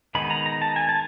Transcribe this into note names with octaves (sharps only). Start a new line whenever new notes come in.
D#3 G#3 B3 D#4 B5
A#5
A#5
A5
G#5
A5